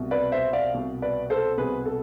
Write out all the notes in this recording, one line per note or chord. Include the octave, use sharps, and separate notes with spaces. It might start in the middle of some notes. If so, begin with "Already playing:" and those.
Already playing: C2 B2
B4 D5
C5 E5
D5 F5
C2 B2
B4 D5
A4 C5
C2 B2 G#4 B4
A4